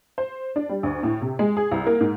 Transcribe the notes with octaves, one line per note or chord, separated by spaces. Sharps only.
C5
D4
G3
D2
A2
C3
G#3
G#4
C2
A#3
G#2